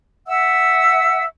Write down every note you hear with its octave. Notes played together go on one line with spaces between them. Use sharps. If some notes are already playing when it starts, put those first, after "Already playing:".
E5 F#5 E6